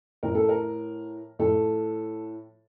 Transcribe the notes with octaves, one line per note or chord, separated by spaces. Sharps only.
A2 F3 A#4
A4
A#4
A2 F3 A4